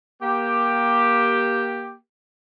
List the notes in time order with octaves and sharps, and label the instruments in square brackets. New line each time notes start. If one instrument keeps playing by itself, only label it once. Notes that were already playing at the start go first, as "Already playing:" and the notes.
[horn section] A#3 G4